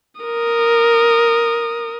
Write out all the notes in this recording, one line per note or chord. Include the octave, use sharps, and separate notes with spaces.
A#4 D#6